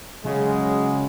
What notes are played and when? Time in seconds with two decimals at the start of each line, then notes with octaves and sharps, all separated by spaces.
0.25 C#3 F#3 G#3